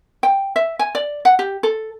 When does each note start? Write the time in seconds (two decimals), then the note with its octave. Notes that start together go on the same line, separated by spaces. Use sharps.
0.23 G5
0.56 E5
0.79 G#5
0.95 D5
1.25 F#5
1.39 G4
1.63 A4